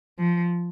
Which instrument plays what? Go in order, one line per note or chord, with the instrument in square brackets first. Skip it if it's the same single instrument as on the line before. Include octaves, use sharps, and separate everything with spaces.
[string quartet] F3